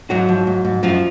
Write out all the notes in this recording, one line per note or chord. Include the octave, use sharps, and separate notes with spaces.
G#2 F#3 F#4
F3
G#2
G#2
F#2 F3 F4